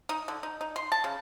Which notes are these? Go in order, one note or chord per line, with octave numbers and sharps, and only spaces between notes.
D#4
D3
D#4
D#4
C6
A5
C#3